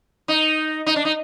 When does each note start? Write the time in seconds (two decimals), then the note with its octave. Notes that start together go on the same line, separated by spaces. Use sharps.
0.28 D#4
0.86 D#4
0.96 D4
1.05 D#4